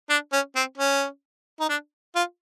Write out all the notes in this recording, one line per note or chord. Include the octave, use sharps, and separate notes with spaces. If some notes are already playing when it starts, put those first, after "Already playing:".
D4
C#4
C4
C#4
D#4
D4
F4